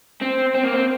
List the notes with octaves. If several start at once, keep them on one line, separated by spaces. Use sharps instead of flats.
C4
C4
A#3
C4